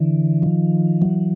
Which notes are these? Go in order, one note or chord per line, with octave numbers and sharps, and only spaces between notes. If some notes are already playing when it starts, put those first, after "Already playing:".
Already playing: D3 E3
D#3 F3
E3 F#3